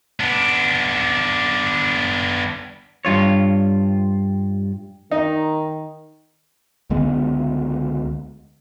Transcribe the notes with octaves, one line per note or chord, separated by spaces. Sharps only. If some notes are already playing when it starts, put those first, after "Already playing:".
B3 D4
G2 F4 C#5
D#3 D#4
C#2 D3 G#3 B3